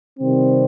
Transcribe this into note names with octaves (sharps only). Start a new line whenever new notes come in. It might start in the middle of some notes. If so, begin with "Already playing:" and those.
C3 D#3 G3 C4